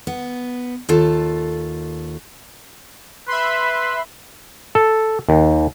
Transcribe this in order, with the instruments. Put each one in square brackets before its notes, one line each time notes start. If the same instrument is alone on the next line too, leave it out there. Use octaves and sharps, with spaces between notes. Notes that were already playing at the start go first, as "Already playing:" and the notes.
[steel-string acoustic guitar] B3
D#2 F4 A4 A5
[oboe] B4 [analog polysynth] E5 B5 C6
[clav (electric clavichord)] A4
D#2